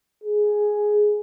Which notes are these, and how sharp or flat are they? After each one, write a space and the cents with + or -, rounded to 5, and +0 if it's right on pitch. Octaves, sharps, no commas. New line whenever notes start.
G#4 +5